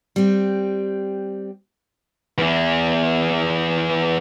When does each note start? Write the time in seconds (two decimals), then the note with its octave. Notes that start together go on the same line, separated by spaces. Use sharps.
0.16 G3 C4
2.38 E2 E3